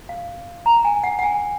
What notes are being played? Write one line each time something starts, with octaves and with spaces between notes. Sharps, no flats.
F5
A#5
G#5
F#5
F#5
G#5